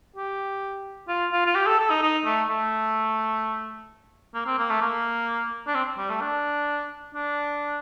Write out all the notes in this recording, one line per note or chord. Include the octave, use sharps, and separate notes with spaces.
G4
F4
F4
F4
G4
A4
A4
D#4
D#4
A3
A3
A#3
C4
A#3
A3
A#3
D4
C4
G3
A3
D4
D4